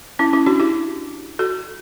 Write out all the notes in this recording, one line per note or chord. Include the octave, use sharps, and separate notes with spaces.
C#4 E4
C#4 E4
D4 F#4
E4 G4
F#4 A4